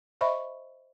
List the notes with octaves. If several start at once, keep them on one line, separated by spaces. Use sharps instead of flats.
C5 D#5 E5 B5 C#6